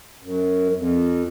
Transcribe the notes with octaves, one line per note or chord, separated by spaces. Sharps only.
F#2
F2